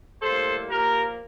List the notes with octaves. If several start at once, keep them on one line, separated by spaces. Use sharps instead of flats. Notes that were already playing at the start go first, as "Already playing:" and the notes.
A2 G3 A#3 A4 C5
A#2 F3 A#3 G4 A#4